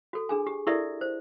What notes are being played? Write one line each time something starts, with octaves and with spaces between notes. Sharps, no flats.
F#4 A4
D4 G#4 G#5
G4
E4 G4 A4 A#4 D5 E5
C5